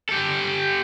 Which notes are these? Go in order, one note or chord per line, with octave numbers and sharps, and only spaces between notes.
G4 A4